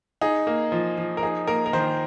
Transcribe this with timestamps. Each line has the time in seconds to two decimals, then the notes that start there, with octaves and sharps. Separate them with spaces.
0.21 D#4 G#4
0.47 A#3
0.72 F3
0.98 F3
1.17 A#4
1.23 D#4 G#4
1.47 A#3 A#4
1.66 A#4
1.73 D#3 C5